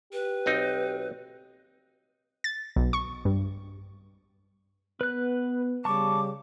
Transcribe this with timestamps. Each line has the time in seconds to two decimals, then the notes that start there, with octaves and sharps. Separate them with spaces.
0.13 G4 B4
0.46 B1 C4 D#4
2.44 A6
2.76 B1
2.93 C#6
3.25 G2
5.01 B3 B4 F#6
5.85 C#3 G3 A5 C#6 D6